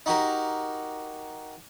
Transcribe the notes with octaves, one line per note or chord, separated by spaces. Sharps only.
D#4 F#4 G4 A#4